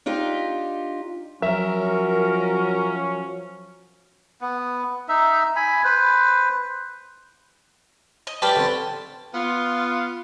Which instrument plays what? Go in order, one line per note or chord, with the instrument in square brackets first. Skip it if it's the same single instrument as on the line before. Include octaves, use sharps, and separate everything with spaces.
[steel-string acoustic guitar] D4 D#4 F4 G4
[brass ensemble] F3 F#3 [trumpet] C#4 [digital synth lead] A#4 [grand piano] E5
[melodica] B3
D#4 E5
G#5 B5
B4 C5
[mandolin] D#5
[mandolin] C#4 G5 A5 [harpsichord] G4 B4 D5
[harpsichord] D3 C4
[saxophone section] B3 F4